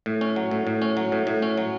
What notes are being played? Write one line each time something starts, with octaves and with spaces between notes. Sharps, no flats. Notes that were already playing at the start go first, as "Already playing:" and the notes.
A2
C#4
F#3
A2
A2
C#4
F#3
A2
A2
C#4
F#3